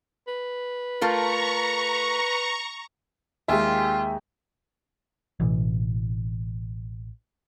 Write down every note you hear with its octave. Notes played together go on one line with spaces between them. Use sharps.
B4
A3 F4 A#4 A#5 C#6
D#2 G#3 F4 G4 E5 G#5
A1 B2 E3